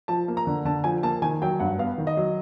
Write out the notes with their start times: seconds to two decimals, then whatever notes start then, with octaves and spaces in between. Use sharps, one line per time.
0.08 F3 A5
0.28 A#3
0.37 A#5
0.47 D3
0.65 D3 A5
0.84 F3 G#5
1.03 A#3 A5
1.22 D#3 G#5
1.42 F#3 G5
1.60 G2 F#5
1.78 B3 F5
1.98 D#3
2.07 D#5
2.17 F#3